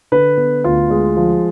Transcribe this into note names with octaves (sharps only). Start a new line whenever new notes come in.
D3 B4
B3
D2 F4
G#3
F3